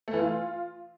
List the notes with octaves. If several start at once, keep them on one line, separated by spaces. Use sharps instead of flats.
A3
E3
F4